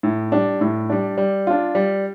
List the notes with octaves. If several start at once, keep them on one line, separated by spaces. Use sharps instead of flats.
A2
G3 D4
A2
G3 D4
G3
D4 F4
G3